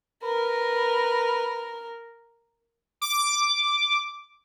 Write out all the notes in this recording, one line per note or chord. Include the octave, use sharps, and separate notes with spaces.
A#4 B4
D6